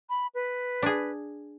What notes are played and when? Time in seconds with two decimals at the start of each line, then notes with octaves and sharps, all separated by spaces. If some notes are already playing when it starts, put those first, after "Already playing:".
0.10 B5
0.35 B4
0.83 D4 G#4